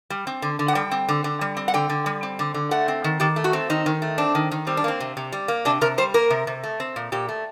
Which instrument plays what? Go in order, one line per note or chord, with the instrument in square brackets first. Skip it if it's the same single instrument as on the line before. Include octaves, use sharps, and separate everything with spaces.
[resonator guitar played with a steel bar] G3
C4
D3
D3
F#5
G3 G5
C4
D3
D3
G3
C4
F#5
D3 G5
D3
G3
C4
D3
D3
A3 F#5
C4
D#3
D#3 G4
A3
F#4
C4
D#3 D#4
D#3
A3
C4 D4
D#3
D#3
G3 C4
D4
A#3 C4
C3
C3
G3
A#3
C3 D4
C3 A#4
G3 C5
A#3 A#4
C3
C3
A3
C4
A#2
A#2 G4
A3